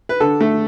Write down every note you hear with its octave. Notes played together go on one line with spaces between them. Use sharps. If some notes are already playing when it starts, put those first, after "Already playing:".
B4
D3 A4
A3